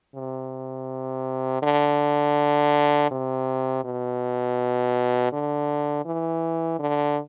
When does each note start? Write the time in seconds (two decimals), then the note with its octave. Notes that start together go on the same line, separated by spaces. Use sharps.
0.15 C3
1.63 D3
3.11 C3
3.85 B2
5.32 D3
6.05 E3
6.80 D3